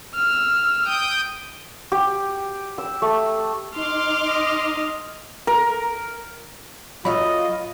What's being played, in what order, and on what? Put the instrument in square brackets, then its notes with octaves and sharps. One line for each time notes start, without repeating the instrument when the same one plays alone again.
[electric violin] E6 F6
[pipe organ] G5 D#6 G6
[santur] G4
E6
A3
[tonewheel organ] D#4 [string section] C6 D6 [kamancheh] F6
[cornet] D#5
[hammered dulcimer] A#4
[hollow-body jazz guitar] F#3 A3 F5 [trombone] F4 [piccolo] D#5 [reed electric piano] B5